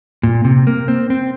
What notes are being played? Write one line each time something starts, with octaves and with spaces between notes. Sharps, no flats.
A#2
C3
A#3
C4
C4